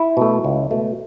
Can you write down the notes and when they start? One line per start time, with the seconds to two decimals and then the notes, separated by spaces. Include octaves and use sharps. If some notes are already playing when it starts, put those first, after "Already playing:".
Already playing: E4
0.17 B2 A3
0.44 C#2
0.71 B2 A3